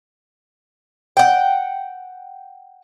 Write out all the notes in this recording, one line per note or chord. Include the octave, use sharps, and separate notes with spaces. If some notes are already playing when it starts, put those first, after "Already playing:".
F#5 G5